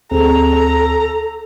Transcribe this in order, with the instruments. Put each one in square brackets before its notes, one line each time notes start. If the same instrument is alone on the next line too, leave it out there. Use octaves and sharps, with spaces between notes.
[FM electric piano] D2 C4 G#4 [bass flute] A4 [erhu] A#5